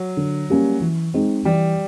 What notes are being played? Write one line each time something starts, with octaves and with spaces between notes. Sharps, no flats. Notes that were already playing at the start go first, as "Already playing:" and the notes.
Already playing: F#3
D3
G3 A#3 C#4
E3
G#3 C4 D#4
E3 G3